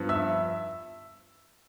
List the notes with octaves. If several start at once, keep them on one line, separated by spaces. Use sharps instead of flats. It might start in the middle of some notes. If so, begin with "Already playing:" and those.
Already playing: G2 F3 B3
E5 E6